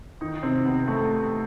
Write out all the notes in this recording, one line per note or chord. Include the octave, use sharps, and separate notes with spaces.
D#3 D#4
C3 C4
B3
A3